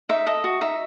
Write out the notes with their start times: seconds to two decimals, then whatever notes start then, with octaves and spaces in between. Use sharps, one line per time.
0.09 D#4 E5
0.26 A4 D#5
0.44 F#4
0.61 D#4 E5